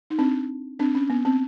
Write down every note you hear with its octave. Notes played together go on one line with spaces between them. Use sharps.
D#4
C4 D4
C4 D4
C#4
B3
C4